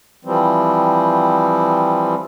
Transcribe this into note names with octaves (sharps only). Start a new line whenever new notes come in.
E3 F3 G3 C4